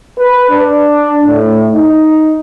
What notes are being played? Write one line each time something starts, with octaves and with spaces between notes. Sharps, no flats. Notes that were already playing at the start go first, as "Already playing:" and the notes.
B4
D4
A2
D#4